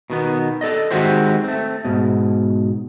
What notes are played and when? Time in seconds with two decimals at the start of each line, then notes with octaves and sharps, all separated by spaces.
0.10 B2 D#3 B3
0.61 A4 D5 D#5
0.91 D#3 G#3 C4 F#4 G4 C5
1.44 A3 C4
1.85 G#2 B2